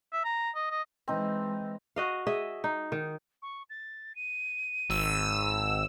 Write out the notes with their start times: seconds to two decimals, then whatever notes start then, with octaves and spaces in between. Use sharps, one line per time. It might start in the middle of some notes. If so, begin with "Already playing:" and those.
0.13 E5
0.24 A#5
0.55 D#5
0.71 D#5
1.08 E3 G#3 C4 D#4
1.96 F#4 D#5 F5
2.27 G#4 D#5 E5
2.64 D#4
2.92 D#3
3.42 C#6
3.70 A6
4.15 D#7
4.89 G#1 E6